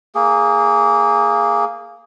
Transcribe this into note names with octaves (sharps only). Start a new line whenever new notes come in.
A#3 G#4